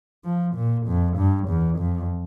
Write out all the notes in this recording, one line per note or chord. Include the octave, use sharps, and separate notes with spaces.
F3
A#2
F2
G2
E2
F2